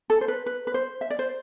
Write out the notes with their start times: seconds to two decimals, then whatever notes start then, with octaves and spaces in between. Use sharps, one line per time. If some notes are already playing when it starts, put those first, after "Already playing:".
0.10 A4
0.21 C5
0.28 B4
0.46 B4
0.67 B4
0.74 C5
1.01 E5
1.10 D5
1.19 C5